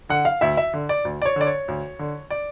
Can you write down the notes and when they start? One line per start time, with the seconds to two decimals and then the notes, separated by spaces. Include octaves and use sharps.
0.09 D3 F#5
0.25 F5
0.41 D2 E5
0.57 E5
0.73 D3
0.89 D5
1.05 D2
1.22 D5
1.25 C#5
1.36 D3 D5
1.47 C#5
1.68 D2
1.99 D3
2.30 D5